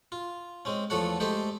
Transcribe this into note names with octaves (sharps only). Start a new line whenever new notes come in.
F4
G#3 C4 C#4
E2 F3 A3 A4 C#5 F#5
G#3 A3 G4 A4 C5 E5